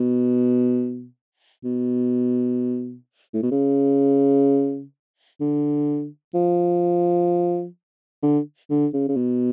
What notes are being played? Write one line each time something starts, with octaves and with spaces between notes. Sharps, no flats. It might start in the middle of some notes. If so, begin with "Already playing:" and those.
Already playing: B2
B2
A2
B2
C#3
D3
F3
D3
D3
C#3
C#3
B2